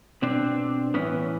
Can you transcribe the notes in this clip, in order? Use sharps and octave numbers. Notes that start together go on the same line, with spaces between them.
B2 C4 D4
A2 E3 B3 C#4